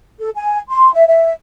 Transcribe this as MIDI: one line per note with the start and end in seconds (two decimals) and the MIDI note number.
0.19 0.29 69
0.35 0.57 80
0.69 0.92 84
0.93 1.04 76
1.07 1.31 76